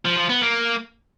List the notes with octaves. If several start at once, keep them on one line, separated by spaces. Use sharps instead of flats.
F3
F3
B3
A#3